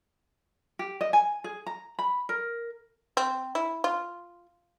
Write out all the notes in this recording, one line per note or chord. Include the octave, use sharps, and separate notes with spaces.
G4
D#5
G#5
G#4
A#5
B5
A#4
C4
E4
F4